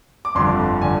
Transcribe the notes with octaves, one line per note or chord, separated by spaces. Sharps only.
D6
G1 F2 D3 C6
D3 G#5